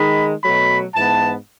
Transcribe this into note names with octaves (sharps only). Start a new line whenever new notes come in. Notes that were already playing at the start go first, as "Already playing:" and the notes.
Already playing: D#3 G#3 D#4 B5
B2 F#3 A3 B5
G#2 E3 B3 A5